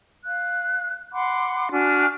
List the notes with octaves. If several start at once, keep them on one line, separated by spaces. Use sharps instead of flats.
F5 F#6
F#5 B5 C6 D6
D4 F#4 G#5 F6